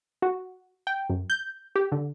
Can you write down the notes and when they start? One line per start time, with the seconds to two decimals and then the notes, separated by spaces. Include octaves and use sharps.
0.22 F#4
0.87 G5
1.10 F#2
1.30 G6
1.76 G4
1.92 D3